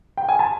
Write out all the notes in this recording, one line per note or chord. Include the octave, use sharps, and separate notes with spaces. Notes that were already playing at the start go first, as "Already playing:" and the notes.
G5
G#5
A5